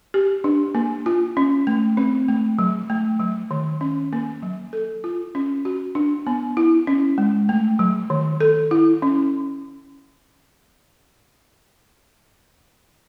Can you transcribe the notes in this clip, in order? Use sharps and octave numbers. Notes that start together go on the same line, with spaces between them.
G4
D4
A#3
F4
C#4
A3
C4
A3
F#3
A3
F#3
D#3
C#4
A#3
F#3
A4
F4
C#4
F#4
D4
B3
E4
C#4
G#3
A3
F#3
D#3
A4
E4
C#4